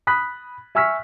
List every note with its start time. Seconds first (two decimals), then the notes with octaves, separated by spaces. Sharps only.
0.07 B5 D#6 F#6 B6
0.75 E5 G#5 C#6 E6 F6 B6